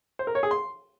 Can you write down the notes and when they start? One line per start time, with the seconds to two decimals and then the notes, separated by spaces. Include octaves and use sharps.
0.19 C5
0.27 A#4
0.35 C#5
0.43 G#4
0.51 C6